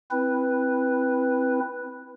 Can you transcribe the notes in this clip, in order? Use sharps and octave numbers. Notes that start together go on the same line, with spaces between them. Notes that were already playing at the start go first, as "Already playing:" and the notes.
C4 E4 B4